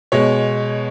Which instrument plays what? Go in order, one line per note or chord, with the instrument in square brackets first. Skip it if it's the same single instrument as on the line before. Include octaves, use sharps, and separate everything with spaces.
[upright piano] B2 G#3 C#5